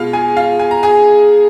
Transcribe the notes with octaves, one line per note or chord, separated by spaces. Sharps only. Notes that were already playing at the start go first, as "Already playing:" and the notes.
Already playing: B2 G#3 F4 F5
G#4 G#5
F4 F5
G#5
A#5
G#4 G#5